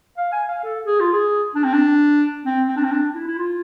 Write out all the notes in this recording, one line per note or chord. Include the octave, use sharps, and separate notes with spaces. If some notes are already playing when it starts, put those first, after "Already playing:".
F5
G#5
F5
A4
G#4
F4
G#4
D4
C4
D4
C4
C4
D4
C4
D4
E4
E4
F4